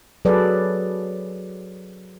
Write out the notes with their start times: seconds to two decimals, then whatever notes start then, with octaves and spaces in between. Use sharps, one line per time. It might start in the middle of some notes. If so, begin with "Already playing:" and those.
0.25 F#3 G#4 A4 B4 D5